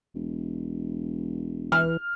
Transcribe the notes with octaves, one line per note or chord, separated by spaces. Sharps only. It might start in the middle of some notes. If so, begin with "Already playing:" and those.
E1
E3 F6